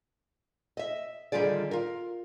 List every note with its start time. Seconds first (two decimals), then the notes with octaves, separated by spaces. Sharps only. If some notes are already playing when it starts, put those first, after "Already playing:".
0.77 D#5 E5
1.32 D3 D#3 G3 F4 G#4 D5
1.71 F4 A#4